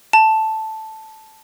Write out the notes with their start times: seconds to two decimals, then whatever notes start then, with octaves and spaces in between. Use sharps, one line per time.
0.13 A5